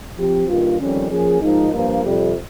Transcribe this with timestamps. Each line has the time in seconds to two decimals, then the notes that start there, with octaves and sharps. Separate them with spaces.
0.17 F3 C4 G4
0.48 G2 D#3 G3 A#3 F4
0.79 F2 D#3 G3 C#4
1.11 F3 A#3 C#4 G#4
1.41 G#2 F3 A#3 D#4
1.72 G2 F3 A#3
2.03 F2 C3 G3